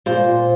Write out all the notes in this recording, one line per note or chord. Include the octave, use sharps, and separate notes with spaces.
A#2 C5